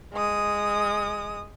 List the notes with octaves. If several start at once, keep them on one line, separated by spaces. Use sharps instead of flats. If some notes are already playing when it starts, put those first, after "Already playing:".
G#3 D#6